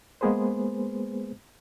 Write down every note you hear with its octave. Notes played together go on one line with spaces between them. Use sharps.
G#3 A#3 B3 G#4 B4 C5